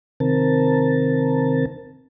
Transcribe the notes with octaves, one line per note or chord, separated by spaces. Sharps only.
C3 D#3 C4 A#4 A5